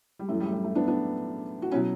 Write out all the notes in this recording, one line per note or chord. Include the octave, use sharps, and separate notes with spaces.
G3
F#2 E3 A3
G3
A3
G3
A3
B3 D4
B3 D4
F#4
B2 F#3 C#4 E4